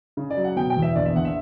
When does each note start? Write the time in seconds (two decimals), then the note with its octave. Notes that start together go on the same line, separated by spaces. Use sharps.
0.17 C#3
0.30 D5
0.37 F#3
0.44 F#5
0.56 B2 G5
0.70 G5
0.77 E2
0.82 E5
0.95 A#1 D5
1.06 E5
1.16 A#1 F#5
1.25 E5